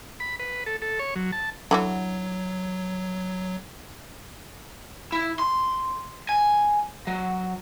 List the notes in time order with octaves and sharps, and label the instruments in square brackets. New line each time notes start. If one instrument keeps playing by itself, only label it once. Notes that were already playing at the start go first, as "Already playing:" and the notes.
[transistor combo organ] B5
B4
A4
A4
C#5
F#3
A5
[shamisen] D3 E3 F#4 [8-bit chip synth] F#3
[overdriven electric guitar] E4
C6
G#5
F#3